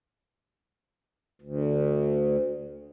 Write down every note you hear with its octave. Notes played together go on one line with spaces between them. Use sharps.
D2